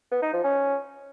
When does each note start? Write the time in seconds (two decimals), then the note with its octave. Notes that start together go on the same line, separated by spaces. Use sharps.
0.11 B3
0.22 D#4
0.33 F3
0.44 C#4